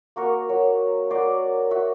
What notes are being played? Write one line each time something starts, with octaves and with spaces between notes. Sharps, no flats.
A#3 F#4 A#4 C#6
F#3
F#4 A#4 D5 C6
F#4 E5